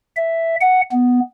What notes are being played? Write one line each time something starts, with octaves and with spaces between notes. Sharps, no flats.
E5
F#5
B3